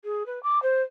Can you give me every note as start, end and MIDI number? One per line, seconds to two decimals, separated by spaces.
0.04 0.26 68
0.26 0.42 71
0.43 0.61 86
0.62 0.82 72